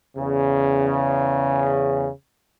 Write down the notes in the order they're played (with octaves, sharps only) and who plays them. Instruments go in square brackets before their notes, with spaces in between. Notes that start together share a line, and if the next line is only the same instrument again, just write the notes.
[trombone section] E2 C#3